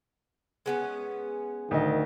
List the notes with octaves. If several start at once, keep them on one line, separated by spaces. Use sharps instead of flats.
G#3 B3 C#4
D2 D#3 D#5